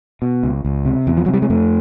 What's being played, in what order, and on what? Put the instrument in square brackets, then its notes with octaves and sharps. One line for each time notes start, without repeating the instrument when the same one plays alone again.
[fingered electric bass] B2
C#2
C#2
C3
E2
F3
C3 F#3
G3
G#3
F2 A3